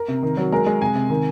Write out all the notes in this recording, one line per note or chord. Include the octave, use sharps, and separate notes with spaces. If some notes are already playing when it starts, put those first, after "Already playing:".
Already playing: A#4
C3
D#3
F#3
G#3 A#4
G#3
C3 G#5
C3
D#3